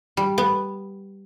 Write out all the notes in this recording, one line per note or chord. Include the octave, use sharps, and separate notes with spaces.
G3
B3